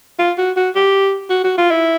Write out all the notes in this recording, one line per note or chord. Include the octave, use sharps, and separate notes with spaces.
F4
F#4
F#4
G4
F#4
F#4
F4
E4